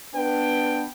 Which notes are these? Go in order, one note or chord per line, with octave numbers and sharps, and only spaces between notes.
B3 D4 B4 G5